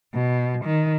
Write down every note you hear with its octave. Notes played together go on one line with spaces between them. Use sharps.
B2
D#3